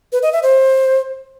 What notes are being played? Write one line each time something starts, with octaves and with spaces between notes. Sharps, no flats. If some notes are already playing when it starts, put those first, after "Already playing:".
B4
D#5
E5
C5